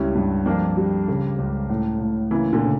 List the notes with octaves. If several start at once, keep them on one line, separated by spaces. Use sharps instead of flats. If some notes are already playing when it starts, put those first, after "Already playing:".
Already playing: C#2 G3 C#4 E4
G2
F2 A#3 D4
G3
C#3
C#2
A2
A2
C#3 E3 A#3
A#2 D3
C#3